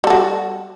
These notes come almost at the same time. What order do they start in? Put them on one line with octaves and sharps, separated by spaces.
G3 A4 F#4